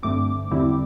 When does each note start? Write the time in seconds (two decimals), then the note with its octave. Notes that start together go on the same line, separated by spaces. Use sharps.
0.03 G2 D3 A3 C4 D6
0.51 E2 D3 G3 C4 E4